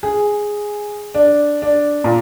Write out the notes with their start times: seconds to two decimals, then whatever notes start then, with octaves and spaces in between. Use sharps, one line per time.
0.03 G#4
1.15 D4
1.62 D4
2.04 A#2